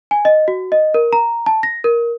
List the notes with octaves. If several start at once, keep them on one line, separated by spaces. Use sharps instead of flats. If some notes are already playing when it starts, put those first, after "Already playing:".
G#5
D#5
F#4
D#5
A#4
A#5
A5
A#6
A#4